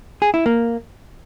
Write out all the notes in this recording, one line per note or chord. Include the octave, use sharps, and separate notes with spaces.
G#4
E4
A#3